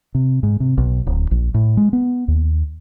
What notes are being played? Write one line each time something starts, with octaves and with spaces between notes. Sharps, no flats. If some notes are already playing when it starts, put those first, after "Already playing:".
C3
G#2
C3
B1
D1
A#1
A2
G#3
B3
D#2